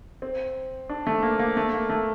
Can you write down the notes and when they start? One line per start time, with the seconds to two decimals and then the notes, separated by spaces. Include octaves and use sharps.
0.22 C4
0.89 D4
1.07 A3
1.23 A#3
1.39 A#3
1.57 A3
1.74 A#3
1.90 A3